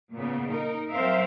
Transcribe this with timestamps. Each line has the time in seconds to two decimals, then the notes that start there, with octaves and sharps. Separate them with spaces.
0.14 A#2 C#3 B3
0.49 D#4 A#4
0.92 F#3 C4 A#4 C5 E5 F5